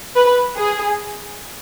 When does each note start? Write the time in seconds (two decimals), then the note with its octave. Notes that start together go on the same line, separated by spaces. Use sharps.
0.16 B4
0.57 G#4